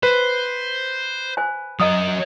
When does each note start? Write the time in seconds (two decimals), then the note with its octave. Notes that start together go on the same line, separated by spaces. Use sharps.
0.03 B4 C5
1.37 C5 G#5
1.80 F#3 A#4 D#5 D#6